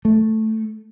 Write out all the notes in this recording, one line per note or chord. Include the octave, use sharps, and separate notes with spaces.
A3